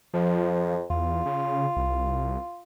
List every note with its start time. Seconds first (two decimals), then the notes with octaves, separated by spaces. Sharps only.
0.14 F2 F3
0.90 E2 F4
1.26 C#3
1.77 C2